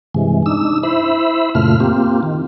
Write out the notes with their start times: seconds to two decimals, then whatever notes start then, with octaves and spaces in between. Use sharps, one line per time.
0.15 G2 C3 E3 G#3
0.46 D4 D#4 E6
0.83 E4 C5 E5 B5
1.55 F#2 A#2 C#3 A3 F4 F6
1.80 A#3 C4 F4 G4
2.23 D#3